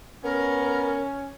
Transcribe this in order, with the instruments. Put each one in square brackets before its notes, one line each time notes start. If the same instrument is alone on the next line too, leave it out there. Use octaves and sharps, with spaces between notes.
[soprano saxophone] B3 [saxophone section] C#4 [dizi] A#4